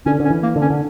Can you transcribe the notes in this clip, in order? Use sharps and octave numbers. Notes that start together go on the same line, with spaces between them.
D3 C#4
D3
C#4
E3
A#3
D3
C#4
D3